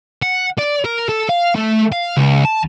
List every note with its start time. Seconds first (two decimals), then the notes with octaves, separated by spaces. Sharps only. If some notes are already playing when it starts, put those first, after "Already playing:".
0.23 F#5
0.59 D5
0.85 A#4
1.09 A4
1.29 F5
1.56 A3
1.92 F5
2.17 C#2
2.45 A5